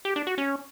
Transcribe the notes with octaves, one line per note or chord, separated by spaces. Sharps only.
G4
D4
F#4
C#4